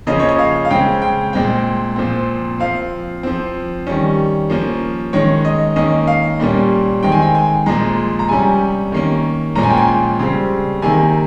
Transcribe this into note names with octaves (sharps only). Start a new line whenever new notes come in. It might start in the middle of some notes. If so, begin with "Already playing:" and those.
C#3 F3 A#3 C#4 D#5
C#5
D#5
F5
F5
C#3 G#3 C4 G5
G5
A#2 G#3 C4 G5
A#2 F3 C4
F3 C4 F5
F3 C4
D#3 G3 C#4
F3 A#3 C#4
D#3 G#3 C#4 C#5
D#5
D#3 A#3 C#4 D#5
F5
A#2 G3 A#3 C#4
D#3 G#3 C4 G5
G#5
G5
G#5
A#2 F3 G#3 A#5
A#5
C3 G3 C#4 G#5
D#3 A#3 C#4
A#2 F3 G#3 C#4 A#5
G#5
G5
G#5
C#3 G3 C4
C3 D#3 A#3 G#5